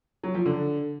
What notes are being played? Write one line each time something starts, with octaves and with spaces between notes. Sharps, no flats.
F#3
F3
D3